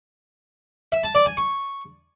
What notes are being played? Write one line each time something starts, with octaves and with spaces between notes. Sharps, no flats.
E5
A5
D5
G#5
C#6